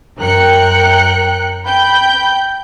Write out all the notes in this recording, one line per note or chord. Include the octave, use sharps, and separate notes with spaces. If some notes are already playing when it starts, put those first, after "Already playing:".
F#2 A#4 G5 F#6 C#7
G5 B5 G6